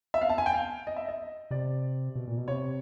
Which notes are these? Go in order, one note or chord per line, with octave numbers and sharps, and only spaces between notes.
E5
F5
A5
G#5
G5
F5
D#5
E5
D#5
C3 D5
B2
A#2
B2
C3 C#5